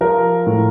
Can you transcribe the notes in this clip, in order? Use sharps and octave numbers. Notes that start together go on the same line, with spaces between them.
F3 A#4
A2